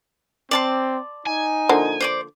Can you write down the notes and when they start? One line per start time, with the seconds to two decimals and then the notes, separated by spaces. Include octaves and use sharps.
0.51 C4 D5 A5 C6
1.27 D#4 G#5
1.69 D3 F3 A#3
2.01 C5 D5 D6